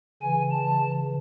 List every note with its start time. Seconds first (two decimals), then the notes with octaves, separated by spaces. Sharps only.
0.22 C#3 E3 G#5
0.51 A5